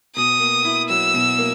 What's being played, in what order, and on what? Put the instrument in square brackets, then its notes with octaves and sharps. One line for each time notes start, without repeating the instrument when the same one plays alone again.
[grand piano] B2 [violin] D#6
[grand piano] A#3
E4
[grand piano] F#3 [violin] E6
[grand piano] B2
A#3